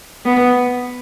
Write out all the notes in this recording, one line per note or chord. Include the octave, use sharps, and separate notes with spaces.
B3